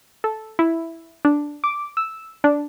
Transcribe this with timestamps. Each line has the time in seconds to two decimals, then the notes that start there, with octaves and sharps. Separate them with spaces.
0.24 A4
0.59 E4
1.25 D4
1.64 D6
1.97 E6
2.44 D4